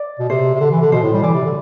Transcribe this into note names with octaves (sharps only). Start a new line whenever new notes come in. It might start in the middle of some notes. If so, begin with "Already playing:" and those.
Already playing: D5
B2
C3 C5
C3
D3
E3
D3
B2 C5
A2
G3
E3 D5
C3
D3